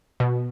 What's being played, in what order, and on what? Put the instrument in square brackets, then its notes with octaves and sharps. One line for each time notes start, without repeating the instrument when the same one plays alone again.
[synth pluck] B2